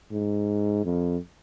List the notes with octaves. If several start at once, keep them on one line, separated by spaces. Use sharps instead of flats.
G#2
F2